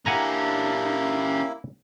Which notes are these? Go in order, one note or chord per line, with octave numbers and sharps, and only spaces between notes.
A#3 C#4 D4 E4 G4 F#5 G#5 A#5